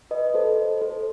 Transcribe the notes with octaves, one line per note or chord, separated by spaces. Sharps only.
B4 D#5
A4 C5
A4 C5